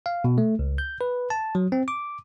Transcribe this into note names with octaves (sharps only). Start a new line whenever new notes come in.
F5
B2
A3
C#2
G6
B4
A5
F#3
C4
D6